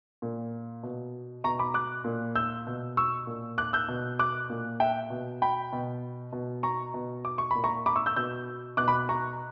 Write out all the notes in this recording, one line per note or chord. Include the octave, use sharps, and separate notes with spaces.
A#2
B2
B2 A#5 C#6
B5 D6
D6 F#6
A#2
E6 G6
B2
C#6 E6
A#2
D6 F#6
E6 G6
B2
D6 F#6
A#2
E5 G5
B2
G5 B5
B2
B2
A#5 C#6
B2
D6
C#6
A#2 B5
A#5 C#6
B5 D6
C#6 E6
E6 G6
B2 E6 G6
B2 D6 F#6
B5 D6
A#5 C#6